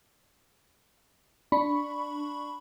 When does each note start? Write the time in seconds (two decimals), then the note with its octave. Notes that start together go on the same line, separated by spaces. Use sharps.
1.52 D4 B5 C#6